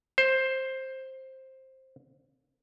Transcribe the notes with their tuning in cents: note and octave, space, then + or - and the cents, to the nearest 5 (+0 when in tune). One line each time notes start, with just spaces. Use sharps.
C5 +10